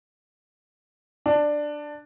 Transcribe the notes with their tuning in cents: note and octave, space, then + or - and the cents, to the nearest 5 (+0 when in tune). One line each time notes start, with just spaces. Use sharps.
D4 +10